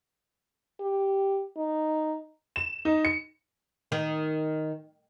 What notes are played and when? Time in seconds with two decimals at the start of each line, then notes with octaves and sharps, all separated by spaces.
0.80 G4
1.57 D#4
2.56 E7
2.85 D#4
3.05 C#7
3.92 D#3